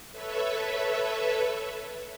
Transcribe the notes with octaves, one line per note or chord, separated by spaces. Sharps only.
A4 B4 C#5 E5